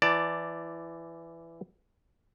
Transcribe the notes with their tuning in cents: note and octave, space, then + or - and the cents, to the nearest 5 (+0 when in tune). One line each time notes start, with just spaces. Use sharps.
E3 +15 D5 +0 A5 +25